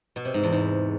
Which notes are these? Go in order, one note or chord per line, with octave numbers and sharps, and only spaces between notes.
B2
C3
G#2
E2
G#2